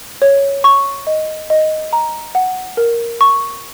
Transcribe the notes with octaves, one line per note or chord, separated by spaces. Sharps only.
C#5
C#6
D#5
D#5
A#5
F#5
A#4
C#6